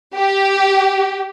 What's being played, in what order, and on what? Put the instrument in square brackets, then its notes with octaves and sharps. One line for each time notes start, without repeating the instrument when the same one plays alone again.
[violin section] G4